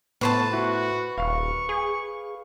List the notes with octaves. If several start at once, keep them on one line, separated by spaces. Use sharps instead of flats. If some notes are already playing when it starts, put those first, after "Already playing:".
A2 B3 B4 C5 A5 C#6
E4 F#4
D#1 F5 C#6
G#4